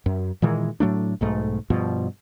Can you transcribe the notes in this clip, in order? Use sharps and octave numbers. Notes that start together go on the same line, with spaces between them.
F#2
A#2 D#3 E3 G#3
A2 F#3 A3 D4
B1 G#2 A3
G2 B2 F3